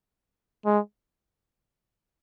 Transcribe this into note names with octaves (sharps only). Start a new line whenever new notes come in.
G#3